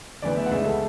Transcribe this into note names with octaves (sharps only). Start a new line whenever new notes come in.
D2 C#3 E3 B3 D5
E5
F#5
C#2 C#3 G#3 E5
A4